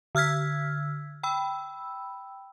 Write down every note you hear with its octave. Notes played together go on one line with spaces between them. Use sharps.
D3 E6 F6 G#6 B6
G5 B5 E6